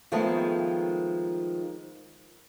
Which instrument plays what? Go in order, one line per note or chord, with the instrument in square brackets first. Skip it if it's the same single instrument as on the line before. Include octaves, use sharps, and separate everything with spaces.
[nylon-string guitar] D#3 F3 G#3 A3 B3 C4